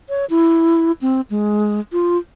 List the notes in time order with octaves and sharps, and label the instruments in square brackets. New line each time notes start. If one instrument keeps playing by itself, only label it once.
[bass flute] C#5
E4
C4
G#3
F4